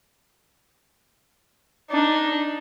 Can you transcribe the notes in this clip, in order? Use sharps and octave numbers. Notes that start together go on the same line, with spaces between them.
D4 D#4